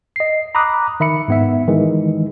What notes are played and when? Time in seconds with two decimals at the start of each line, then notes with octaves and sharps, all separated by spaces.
0.16 D#5 C7
0.55 A#5 B5 D6 D#6 F#6
1.00 D#3 E5 B5 C#7
1.28 G#2 B3 E5
1.68 D#3 E3 G#3